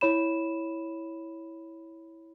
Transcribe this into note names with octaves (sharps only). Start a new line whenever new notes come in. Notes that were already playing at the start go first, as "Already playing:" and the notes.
E4 C#5 B5 E7